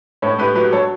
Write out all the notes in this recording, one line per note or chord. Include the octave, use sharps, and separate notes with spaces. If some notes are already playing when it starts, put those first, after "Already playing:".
A2 A4 C#5
A2 G4 B4
F#3 G4 B4
F#3 A4 C#5